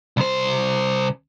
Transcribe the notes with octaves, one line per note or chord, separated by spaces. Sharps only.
C2 C5